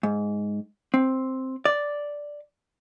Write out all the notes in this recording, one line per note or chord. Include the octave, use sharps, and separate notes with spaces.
G#2
C4
D5